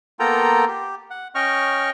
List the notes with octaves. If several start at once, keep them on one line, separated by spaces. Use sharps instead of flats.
A#3 B3 F4 A4 G5 A#5
G4
F#5
C#4 D#5 G5 C#6 F6